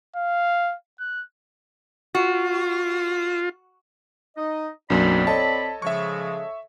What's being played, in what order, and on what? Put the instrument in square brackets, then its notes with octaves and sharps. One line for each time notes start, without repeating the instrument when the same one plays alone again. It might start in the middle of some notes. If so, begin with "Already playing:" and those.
[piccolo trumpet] F5
F#6
[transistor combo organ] F4 [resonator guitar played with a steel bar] F#4
[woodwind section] D#4 D#5
[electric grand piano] B1 F#2 [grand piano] F#3 A#3 D4 [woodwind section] C4 D5 B5
[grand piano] A4 C#5 D#5 [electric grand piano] A5
[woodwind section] C#3 F3 G#3 [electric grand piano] E5 C#6